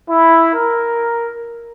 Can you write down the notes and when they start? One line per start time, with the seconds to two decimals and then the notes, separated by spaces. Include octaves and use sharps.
0.10 E4
0.55 A#4